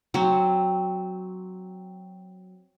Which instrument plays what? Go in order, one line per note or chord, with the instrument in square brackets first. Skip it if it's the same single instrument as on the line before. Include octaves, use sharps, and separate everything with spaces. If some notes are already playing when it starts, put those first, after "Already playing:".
[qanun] F#3 C4